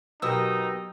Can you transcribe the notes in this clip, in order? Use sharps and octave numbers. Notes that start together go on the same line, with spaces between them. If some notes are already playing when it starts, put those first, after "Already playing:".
B2 F#3 B3 D#4 G4 A#4 D#6 E6